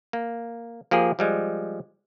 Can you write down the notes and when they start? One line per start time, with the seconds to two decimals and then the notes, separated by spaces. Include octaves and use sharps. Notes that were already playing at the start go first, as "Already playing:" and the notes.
0.13 A#3
0.91 F3 A#3 G4 G#4
1.19 F3 G3 G#3